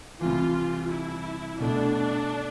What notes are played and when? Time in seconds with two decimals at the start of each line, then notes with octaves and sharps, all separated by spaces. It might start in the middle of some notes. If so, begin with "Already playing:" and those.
0.21 C2 C3 E3 F4
0.91 E4
1.60 B2 A3 D4 E4